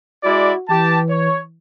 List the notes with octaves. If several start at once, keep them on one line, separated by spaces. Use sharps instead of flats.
G#3 E4 F#4 D5
E3 G4 A5
C#5